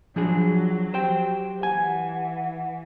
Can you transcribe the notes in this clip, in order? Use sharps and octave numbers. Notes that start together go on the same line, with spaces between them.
F3 F#3 D4 G#4
G4 C5 G5
E3 F#5 G#5